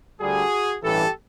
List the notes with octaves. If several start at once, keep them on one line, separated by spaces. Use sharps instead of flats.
D2 D3 G3 F#4 G#4
A1 G2 E3 G4 A4